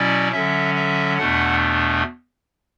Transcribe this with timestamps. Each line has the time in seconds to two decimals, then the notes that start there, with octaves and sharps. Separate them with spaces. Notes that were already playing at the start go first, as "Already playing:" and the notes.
Already playing: B2 F#3 C#4 E4 D5
0.32 D3 F#3 C#4 E5
0.76 E5
1.18 E2 B2 A3 D4 F#5